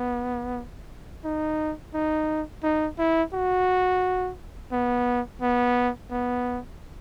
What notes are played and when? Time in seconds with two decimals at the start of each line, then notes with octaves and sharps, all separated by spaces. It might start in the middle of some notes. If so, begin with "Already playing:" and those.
Already playing: B3
1.24 D#4
1.94 D#4
2.63 D#4
2.98 E4
3.34 F#4
4.72 B3
5.41 B3
6.11 B3